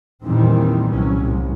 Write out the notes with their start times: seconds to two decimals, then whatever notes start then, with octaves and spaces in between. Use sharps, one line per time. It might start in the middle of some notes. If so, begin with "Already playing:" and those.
0.24 E2 A#2 D#3 E3 G3 C4
0.89 C2 F#3 C#4
1.21 C2 A2